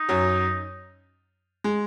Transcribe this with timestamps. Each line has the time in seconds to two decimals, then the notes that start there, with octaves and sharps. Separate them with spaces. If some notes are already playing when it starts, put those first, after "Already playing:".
Already playing: D#4
0.09 F#2 F#3
1.64 G#3